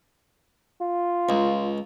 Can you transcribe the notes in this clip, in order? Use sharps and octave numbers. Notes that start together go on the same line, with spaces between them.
F4
C#2